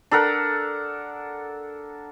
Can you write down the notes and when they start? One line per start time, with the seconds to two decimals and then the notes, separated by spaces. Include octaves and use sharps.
0.11 D4 A4 A#4 F#5